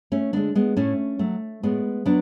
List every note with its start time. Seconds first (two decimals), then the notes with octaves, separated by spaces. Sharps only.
0.12 A3 C#4
0.33 D3 G#3 B3 D4
0.55 G#3 B3
0.77 A2 A3 C#4
1.19 F#3 A3
1.63 A2 G#3 B3
2.05 F#3 B3 D4